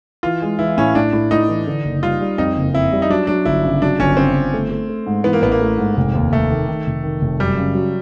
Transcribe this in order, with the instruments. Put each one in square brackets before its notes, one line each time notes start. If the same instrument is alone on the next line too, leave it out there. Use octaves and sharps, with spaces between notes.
[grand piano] E3 [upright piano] F4
[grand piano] G#3
[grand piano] E3 [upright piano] E4
[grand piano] A2 [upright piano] C#4
[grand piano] A2 [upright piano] D4
[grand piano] A2
[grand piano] A2 [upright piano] D#4
[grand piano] E3
D3
F#1
[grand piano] G3 [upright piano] F4
[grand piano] G3
[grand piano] F2 [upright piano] D#4
[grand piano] F#1
[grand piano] F2 [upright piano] E4
[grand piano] G3
[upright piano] D#4
[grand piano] F#3 [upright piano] D4
[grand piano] F#3 [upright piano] D4
[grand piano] G1 [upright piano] E4
[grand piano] C#3
[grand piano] F#3 [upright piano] D4
[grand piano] G1 [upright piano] C#4
[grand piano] C#3 [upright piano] C4
[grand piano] G1
A3
A3
A3
G#2
[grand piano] E3 [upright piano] B3
[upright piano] A#3
[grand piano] A1 [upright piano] B3
[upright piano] A#3
[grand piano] A3
G#2
F1
D#2
[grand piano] F1 [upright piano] A3
[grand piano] D#3
D#3
F1
D#3
F1
[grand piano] F#2 [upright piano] G3
[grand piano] C#3
F#3